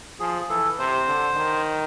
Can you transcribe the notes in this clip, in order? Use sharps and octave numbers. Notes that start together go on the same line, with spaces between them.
F3 G#4
E3 A4
C3 C5
D3
D#3